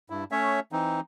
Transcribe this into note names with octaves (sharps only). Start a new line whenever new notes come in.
G2 E4
A3 C#4 C#5 E5
E3 C4 D#4